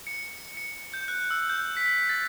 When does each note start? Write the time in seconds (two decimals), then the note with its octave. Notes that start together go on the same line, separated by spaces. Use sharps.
0.07 C#7
0.57 C#7
0.94 G6
1.08 F#6
1.30 E6
1.49 G6
1.77 B6
2.09 A6